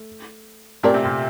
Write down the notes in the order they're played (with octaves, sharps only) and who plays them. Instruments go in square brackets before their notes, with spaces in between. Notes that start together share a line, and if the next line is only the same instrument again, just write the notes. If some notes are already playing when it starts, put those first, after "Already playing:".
Already playing: [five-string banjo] A3
[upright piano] A#2 [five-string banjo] A3 C4 G4 A#4 D5
[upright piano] C3
A#2